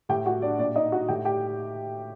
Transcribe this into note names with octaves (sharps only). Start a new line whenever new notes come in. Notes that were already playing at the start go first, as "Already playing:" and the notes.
A2 G4 G5
F#4 F#5
D4 D5
A#2 D4 D5
D#4 D#5
F#4 F#5
A2 G4 G5
G4 G5